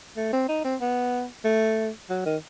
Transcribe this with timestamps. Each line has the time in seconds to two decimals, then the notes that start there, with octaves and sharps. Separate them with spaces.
0.17 A3
0.33 C4
0.49 D#4
0.64 C4
0.81 B3
1.44 A3
2.10 F#3
2.25 D#3